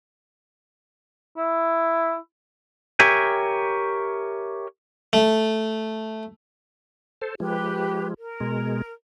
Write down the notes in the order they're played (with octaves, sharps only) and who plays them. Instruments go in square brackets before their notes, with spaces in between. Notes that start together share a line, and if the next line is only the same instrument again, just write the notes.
[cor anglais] E4
[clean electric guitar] G4 A#4 C#5 E5 G5 G#5
[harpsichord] A3
[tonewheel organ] A4 C5
[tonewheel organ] F3 G#3 [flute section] G4 B4
[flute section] A#4
[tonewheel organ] B2 G#3